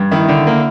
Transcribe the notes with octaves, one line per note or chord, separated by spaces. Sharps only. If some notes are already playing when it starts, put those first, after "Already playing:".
Already playing: G2
D#3 E4
D3
A#3